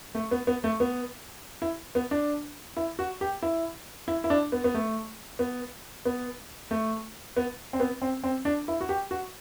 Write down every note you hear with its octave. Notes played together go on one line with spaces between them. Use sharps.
A3
B3
B3
A3
B3
E4
B3
D4
E4
F#4
G4
E4
E4
E4
D4
B3
B3
A3
B3
B3
A3
B3
C4
B3
C4
C4
D4
E4
F#4
G4
F#4